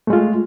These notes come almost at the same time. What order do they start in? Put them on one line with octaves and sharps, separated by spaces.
A3 G#3 F4